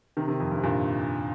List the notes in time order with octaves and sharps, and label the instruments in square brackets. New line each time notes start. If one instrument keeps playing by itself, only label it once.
[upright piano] C3 D#3
C3 D#3
F2
G2
C3
G2 A#2